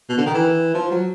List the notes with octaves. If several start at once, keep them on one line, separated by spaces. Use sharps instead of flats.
B2
D3
D#3
E3
F3
F#3